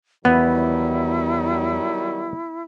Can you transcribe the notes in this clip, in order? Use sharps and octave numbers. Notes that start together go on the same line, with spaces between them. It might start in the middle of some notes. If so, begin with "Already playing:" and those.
E2 D#3 F#3 G3 B3 E4